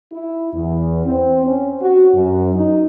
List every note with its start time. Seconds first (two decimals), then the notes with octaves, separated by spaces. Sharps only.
0.12 E4
0.54 E2
1.05 C4
1.46 C#4
1.82 F#4
2.15 F#2
2.55 D#4